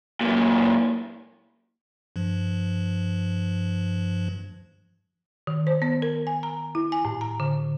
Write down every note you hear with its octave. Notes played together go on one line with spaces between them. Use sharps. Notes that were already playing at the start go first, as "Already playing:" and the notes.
F#2 A#2
G2 F3
D#3
C5
B3
A#4
G#5
A#5
E4
G#5
A2
A#5
D3